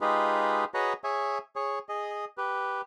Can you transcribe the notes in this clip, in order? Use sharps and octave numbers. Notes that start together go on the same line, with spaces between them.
G#3 D#4 F4 G4 G#4 B4
F#4 G#4 B4 C#5 D#5 A#5
G#4 C#5 E5 G#5
G#4 C#5
G#4 D#5
G4 B4